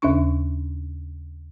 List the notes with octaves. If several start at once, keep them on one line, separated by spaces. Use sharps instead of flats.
D#2 C#3 C#4 D4 C#6